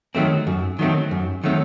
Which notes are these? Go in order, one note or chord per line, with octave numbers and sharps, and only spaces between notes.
D#3 F#3 A3 C4
F#2
D#3 F#3 A3 C4
F#2
D#3 F#3 A3 C4